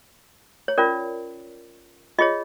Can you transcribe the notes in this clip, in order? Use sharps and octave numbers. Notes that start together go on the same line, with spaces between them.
C#5
C#4 F4 A#4 D5
F4 G#4 C#5 D#5